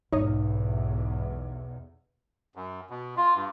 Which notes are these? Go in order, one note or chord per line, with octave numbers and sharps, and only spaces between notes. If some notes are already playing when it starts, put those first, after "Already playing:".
B1 E2 G#2 D#4 C#5 D#5
F#2
B2
F4
G2